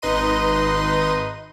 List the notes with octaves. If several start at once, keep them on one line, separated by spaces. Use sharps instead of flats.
G#1 D#4 B4 D#5 C6 D#7